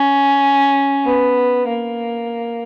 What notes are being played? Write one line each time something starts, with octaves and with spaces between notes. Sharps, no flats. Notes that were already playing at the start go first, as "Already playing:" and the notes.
Already playing: C#4
B3
A#3